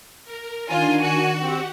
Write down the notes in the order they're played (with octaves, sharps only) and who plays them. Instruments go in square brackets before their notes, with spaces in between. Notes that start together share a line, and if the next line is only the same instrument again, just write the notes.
[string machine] A#4
[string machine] D#3 D4 [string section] F4 [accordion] G#5
[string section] F#4
[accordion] C4 [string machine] G4 F#5